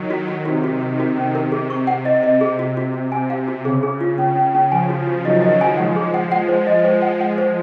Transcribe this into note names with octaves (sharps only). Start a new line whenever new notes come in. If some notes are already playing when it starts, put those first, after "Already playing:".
Already playing: D#3 F#3
F#4
F#4
C3 D#3 F#4
F#4
F#4
C3 F#4
C#4
A#4
C3 G#4
C#6
F#5
D#5
D#5
G#4
F#4
F#4
F#4
C3 G#5
F5
F#4
C#3 G#4
G#4
F4
C#3 C#4
C#4
C#4
C#3 F3 G#5
F#4
F#4
D#3 F#3 D#5
D#5
G#5
F3 G#3 F#5
G#4
F#5
F3 G#3 F#5
C5
D#5
C5
F#5
F#5
C5